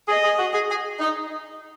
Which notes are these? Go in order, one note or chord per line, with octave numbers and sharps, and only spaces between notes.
G#4 D#5
G#4
F#4
G#4
G#4
D#4